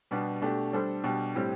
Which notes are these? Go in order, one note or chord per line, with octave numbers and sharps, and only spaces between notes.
B2 G3 B3 D4 G4
B2 A3 D4 G4
G3 D4 A4 C5
B2 G3 D4 G4
A2 G3 C4 G4